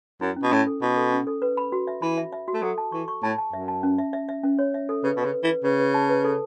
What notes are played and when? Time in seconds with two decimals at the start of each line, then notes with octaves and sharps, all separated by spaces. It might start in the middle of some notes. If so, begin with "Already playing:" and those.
0.21 F#2 E4
0.36 C#4
0.43 B2
0.51 A2 C#4
0.67 A4
0.82 B2 E4
0.97 A4
1.12 C#4
1.27 A4
1.42 B4
1.57 B5
1.72 F#4
1.87 E5
2.02 E3 B5
2.18 E5
2.32 E5
2.48 F#4
2.54 A3
2.62 F#3 A4
2.78 A5
2.92 E3 C#6
3.08 C#6
3.23 A2 A5
3.38 A5
3.53 F#2 E5
3.68 A5
3.83 C#4
3.98 E5
4.13 E5
4.29 E5
4.44 C#4
4.59 C#5
4.74 E5
4.89 A4
5.04 C#3 B4
5.17 B2 B4
5.24 C#3
5.34 B4
5.44 E3
5.49 B4
5.64 C#3 B4
5.80 B4
5.94 A5
6.09 B4
6.24 A4